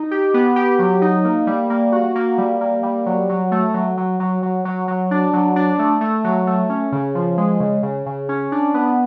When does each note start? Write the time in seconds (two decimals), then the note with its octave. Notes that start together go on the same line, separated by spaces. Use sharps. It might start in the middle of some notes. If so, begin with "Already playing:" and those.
Already playing: D#4
0.11 G4
0.34 B3
0.56 G4
0.79 F#3
1.02 D#4
1.24 A#3
1.47 G3
1.70 A#3
1.92 F#4
2.15 A#3
2.38 G3
2.61 A#3
2.83 G3
3.06 F#3
3.29 F#3
3.52 A3
3.74 F#3
3.97 F#3
4.20 F#3
4.43 F#3
4.65 F#3
4.88 F#3
5.11 D4
5.33 F#3
5.56 D4
5.79 A3
6.01 A3
6.24 F#3
6.47 A3
6.69 C#4
6.92 C#3
7.15 F3
7.37 G#3
7.60 C#3
7.83 C#3
8.06 C#3
8.29 C#4
8.52 D4
8.74 B3